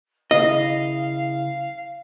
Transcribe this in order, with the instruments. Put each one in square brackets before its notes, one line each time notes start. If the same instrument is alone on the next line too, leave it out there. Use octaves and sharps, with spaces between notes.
[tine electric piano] G#1 C#3 E4 [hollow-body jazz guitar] D#5 [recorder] F5